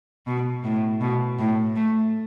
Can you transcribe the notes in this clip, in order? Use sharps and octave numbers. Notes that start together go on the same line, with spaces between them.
B2
A2
B2
A2
A3